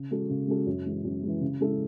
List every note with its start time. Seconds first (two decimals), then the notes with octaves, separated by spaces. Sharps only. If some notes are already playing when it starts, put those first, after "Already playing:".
Already playing: C#3
0.11 G#3 C#4 F#4 A4
0.29 C#3
0.48 G#3 C#4 F#4 A4
0.67 F#2
0.85 E3 G#3
1.04 F#2
1.23 E3 G#3
1.41 C#3
1.61 G#3 C#4 E4 A4